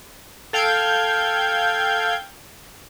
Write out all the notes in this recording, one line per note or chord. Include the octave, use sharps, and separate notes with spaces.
A4 F5 G5 G6 G#6